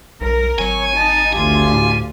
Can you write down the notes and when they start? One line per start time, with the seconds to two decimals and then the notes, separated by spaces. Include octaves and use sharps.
0.21 B1 A#4
0.59 G#1 F#3 C#5 G#5
0.97 D#4 A5
1.33 D2 F4 G4 G#5
1.73 A2